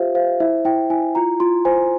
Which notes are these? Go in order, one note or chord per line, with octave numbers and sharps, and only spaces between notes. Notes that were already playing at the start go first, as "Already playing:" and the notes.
Already playing: F4 G4 C5 E5 F5
C5 F5
E4 E5
E4 G5
E4 G#5
F4 A#5
F4 C6
C5 G#5